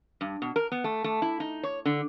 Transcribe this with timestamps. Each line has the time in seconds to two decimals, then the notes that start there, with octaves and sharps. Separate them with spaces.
0.21 G2
0.42 B2
0.56 A#4
0.72 B3
0.84 A3
1.04 A3
1.22 E4
1.40 D#4
1.63 C#5
1.85 D3